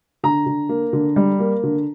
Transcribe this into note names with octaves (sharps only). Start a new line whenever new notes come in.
D3 A#5
D3
A#3
D3
G3
A#3
D3